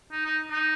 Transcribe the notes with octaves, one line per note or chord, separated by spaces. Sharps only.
D#4
D#4
D#4